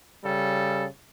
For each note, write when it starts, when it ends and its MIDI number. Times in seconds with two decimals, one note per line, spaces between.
0.25 0.85 49
0.25 0.85 55
0.25 0.85 69